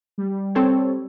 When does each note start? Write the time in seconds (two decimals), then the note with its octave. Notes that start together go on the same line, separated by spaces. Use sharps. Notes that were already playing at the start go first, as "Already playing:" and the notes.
0.18 G3
0.55 C4 A4 C#5